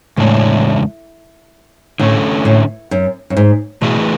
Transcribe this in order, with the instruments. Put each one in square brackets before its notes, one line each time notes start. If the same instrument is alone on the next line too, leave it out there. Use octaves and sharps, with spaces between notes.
[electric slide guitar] E2 C#3 G#3 D4 [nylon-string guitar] A2
[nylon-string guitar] A2 [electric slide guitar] D3 A3 C#4
[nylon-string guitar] A2
F#2
F#2
G#2
[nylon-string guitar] B2 [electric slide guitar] E3 A3 E4 G#4 B4